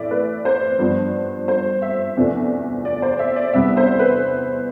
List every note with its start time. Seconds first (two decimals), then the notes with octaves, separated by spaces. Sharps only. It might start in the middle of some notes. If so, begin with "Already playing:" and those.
Already playing: A2 E3 A3 D5 E5
0.11 B4
0.45 C5
0.79 G2 F3 B3 D4
1.48 C5
1.82 E5
2.17 E2 C3 F3 A3 D4
2.85 D5
3.02 C5
3.19 E5
3.36 D5
3.53 E2 C3 G3 B3 D4 E5
3.77 C5
3.99 B4